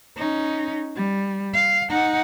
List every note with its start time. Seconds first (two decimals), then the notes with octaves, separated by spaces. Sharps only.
0.17 C#4 D#4
0.96 G3
1.53 F5
1.90 D#4 F#5